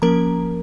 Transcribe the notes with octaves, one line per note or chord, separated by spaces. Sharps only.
F3 A#3 C#4 A#4 A#5